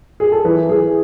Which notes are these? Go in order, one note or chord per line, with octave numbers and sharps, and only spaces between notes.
G#4
A4
E3 B4
E3 G#4